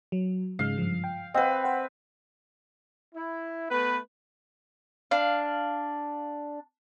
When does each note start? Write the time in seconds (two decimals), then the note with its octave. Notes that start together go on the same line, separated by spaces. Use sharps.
0.12 F#3
0.59 G#2 C#3 G#3 F5
0.78 G2 F3
1.04 G5
1.34 C4 B4 D#5 F5 F#5
1.64 C5 F#5 G5
3.14 E4
3.71 A3 B3 B4
5.11 D4 F5